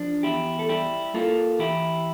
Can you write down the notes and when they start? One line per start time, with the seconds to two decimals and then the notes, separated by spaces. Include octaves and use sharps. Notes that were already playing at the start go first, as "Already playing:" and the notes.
Already playing: F3 D4
0.23 E2 E4 G4
0.59 A4
0.69 G3 E4 G4
1.14 A#3 F4 A4
1.59 E3 E4 G4